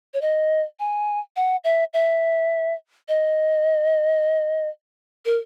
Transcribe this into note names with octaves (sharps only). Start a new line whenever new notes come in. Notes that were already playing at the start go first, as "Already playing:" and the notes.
C#5
D#5
G#5
F#5
E5
E5
D#5
A#4